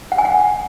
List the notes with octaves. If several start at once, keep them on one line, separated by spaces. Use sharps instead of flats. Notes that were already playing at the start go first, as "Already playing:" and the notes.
F#5
G#5
F#5